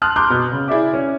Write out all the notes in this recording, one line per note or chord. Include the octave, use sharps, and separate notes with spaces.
A5 C6 D#6 F6 F#6
A#5 C6 D6 F#6 G6
B2
C#3
E4 G#4 D5 E5 D6
C#4